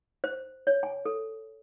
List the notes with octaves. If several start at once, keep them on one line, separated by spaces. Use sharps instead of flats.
C5
C#5
G#5
A4